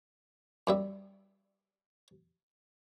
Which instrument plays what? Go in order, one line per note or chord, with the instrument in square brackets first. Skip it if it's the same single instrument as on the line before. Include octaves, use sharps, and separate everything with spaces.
[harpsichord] F#2 G3 E5